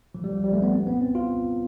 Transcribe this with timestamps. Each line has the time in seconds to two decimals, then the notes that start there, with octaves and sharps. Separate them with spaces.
0.15 F3
0.24 G3
0.33 F3
0.44 G3
0.53 A3
0.62 B3
0.72 C4
0.87 B3
1.01 C4
1.15 F4